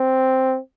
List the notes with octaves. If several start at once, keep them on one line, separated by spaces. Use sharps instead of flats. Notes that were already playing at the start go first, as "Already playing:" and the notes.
Already playing: C4